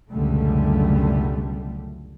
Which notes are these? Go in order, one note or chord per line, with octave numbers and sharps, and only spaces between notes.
C#2 F#2 B2 D3 G3 A3